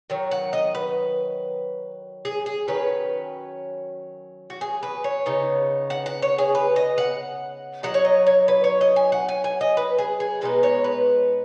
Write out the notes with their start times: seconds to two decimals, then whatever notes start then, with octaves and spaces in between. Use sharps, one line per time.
0.10 D#3 F#3
0.31 F#5
0.53 D#5
0.75 B4
2.25 G#4
2.46 G#4
2.68 D#3 F#3 C#4 B4
4.50 F#4
4.61 G#4
4.83 B4
5.04 C#5
5.26 C#3 B3 D#4
5.90 F#5
6.06 F#5
6.22 C#5
6.38 G#4
6.55 B4
6.76 D#5
6.98 F#5
7.83 F#3 D#4 F#5
7.94 C#5
8.05 D#5
8.27 C#5
8.48 B4
8.64 C#5
8.81 D#5
8.96 G#5
9.12 F#5
9.29 G#5
9.44 G#5
9.61 D#5
9.77 B4
9.98 G#4
10.20 G#4
10.41 B2 G#3 B3 D#4 B4
10.63 C#5
10.84 B4